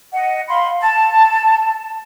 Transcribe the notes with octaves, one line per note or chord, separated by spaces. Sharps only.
D#5 F#5
F5 B5 C6
A5